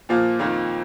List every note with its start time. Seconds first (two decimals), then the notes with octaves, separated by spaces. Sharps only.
0.09 A#2 F3 A#3 F4
0.39 F2 D#3 A#3 F4